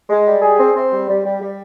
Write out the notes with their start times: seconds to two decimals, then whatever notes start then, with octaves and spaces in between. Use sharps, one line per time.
0.10 G#3
0.26 G3
0.42 G#4
0.59 C4
0.75 C4
0.92 G3
1.08 G3
1.24 G3
1.41 G3